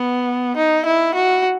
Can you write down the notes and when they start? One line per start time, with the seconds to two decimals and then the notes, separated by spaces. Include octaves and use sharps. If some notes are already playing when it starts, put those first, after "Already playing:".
Already playing: B3
0.57 D#4
0.85 E4
1.15 F#4